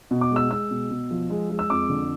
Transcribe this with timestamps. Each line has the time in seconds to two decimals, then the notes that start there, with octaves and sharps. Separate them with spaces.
0.11 B2
0.21 D6
0.31 G#3
0.36 E6
0.51 G#3 E6
0.71 B2
0.91 B2
1.11 F3
1.30 G#3
1.50 G#3
1.59 E6
1.70 F2 D6
1.90 D3